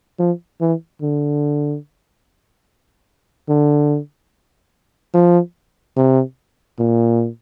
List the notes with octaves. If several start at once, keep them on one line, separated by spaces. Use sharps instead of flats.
F3
E3
D3
D3
F3
C3
A#2